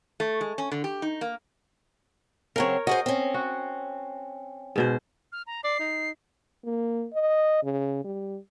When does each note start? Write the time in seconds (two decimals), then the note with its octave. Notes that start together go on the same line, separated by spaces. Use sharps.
0.20 A3
0.41 G#3
0.58 C#4
0.72 D3
0.84 G4
1.02 D#4
1.21 A#3
2.56 C#3 F#3 C4 A#4 C#5
2.87 F#4 G#4 C5 D#5
3.06 C4 C#4
3.34 F#4
4.76 G#2 B2 C5
5.32 F6
5.47 A#5
5.64 D5 C7
5.79 D#4
6.65 A#3
7.14 D#5
7.64 C#3
8.05 G3